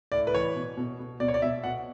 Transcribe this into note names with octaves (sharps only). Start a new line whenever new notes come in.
A2 D5
B4
E3 C#5
B2
B2
B2
B2 D5
C#5
D5
B2 E5
B2 F#5